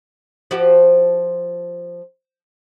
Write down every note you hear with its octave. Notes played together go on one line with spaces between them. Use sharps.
F3 F#4 G4